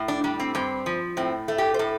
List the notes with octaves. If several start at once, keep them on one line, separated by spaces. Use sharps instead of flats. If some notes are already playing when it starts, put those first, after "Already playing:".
Already playing: A2
D4
G3 D4
C4
G2 C4
F3
A2 C4
A3
G4
C5
A2 A4